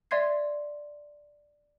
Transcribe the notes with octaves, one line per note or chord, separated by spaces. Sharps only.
D5 E5 C6 G#6 C7